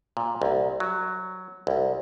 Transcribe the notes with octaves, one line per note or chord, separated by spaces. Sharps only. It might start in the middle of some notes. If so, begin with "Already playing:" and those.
A#2
C2
F#3
C2